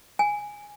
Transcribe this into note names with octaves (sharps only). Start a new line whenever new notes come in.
G#5